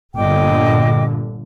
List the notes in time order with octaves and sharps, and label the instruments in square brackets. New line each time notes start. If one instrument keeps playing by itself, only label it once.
[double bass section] G1 A#2 D3 [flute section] D#5 G5 D6